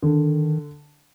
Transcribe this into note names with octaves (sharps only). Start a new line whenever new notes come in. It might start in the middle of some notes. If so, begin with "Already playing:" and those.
D3 D#3